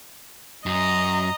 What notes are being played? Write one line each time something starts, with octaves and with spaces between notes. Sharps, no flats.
F#2 D#5 A#5